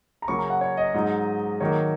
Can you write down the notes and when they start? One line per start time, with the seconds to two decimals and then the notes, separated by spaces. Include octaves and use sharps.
0.22 A#5
0.28 C#3 F#3 A#3 C#4 C#6
0.39 A#5
0.50 F#5
0.61 C#5
0.77 D#5
0.94 G#2 F#3 D#4
1.60 D#3 F#3 A#3 C#5